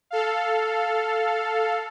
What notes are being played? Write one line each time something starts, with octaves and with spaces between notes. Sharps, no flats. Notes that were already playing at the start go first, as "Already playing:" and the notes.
A4 F5